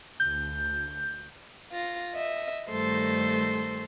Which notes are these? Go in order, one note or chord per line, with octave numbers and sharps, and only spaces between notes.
D2 G6
F4 A#6
D#5 E5
G2 D#3 A3 A4 C5 C6